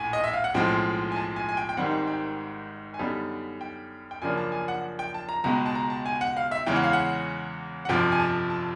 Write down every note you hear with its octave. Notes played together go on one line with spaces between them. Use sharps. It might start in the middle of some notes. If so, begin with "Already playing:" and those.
Already playing: A#1 A2 G#5
D#5
E5
F5
F#5
B1 A2 F3 G#3 C4 G5
G#5
A5
G#5
G#5
G5
G5
G#1 G#2 D#3 G3 C4 F#5
G5
G#5
F#2 D3 G3 B3 D#4 A5
G5
G5
F#2 C#3 F3 A#3 D4 G#5
A5
G#5
F#5
G5
A5
A#5
C#2 B2 G#3 B3 A#5
A5
A#5
A5
G#5
F#5
F5
E5
E2 C#3 E3 G#3 C#4 G5
F#5
F5
F#5
F#5
G1 F2 C3 F3 G5
G#5
A5
A5